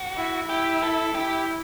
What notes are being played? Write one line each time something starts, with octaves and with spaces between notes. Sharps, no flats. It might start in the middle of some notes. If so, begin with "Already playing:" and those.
Already playing: F#4
E4
E4 G4
A4
E4 G4